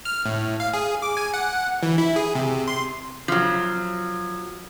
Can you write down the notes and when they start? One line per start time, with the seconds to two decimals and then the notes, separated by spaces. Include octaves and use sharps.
0.05 F6
0.26 A2
0.60 F5
0.74 G#4
1.02 D6
1.17 G#5
1.34 F#5
1.83 E3
1.98 E4
2.16 G#4
2.35 C3
2.68 C6
3.28 F3 F#3